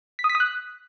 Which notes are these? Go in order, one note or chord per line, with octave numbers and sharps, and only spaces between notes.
B6
D#6
B6
D#6
F#6